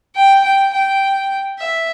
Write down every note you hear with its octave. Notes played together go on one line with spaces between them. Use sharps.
G5
G5
G5
E5